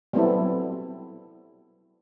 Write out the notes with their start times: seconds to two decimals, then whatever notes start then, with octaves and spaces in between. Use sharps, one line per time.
0.13 F#3 G3 B3 C4 E4 A4